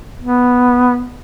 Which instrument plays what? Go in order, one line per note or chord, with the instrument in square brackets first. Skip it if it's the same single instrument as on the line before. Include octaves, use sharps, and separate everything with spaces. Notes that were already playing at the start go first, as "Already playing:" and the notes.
[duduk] B3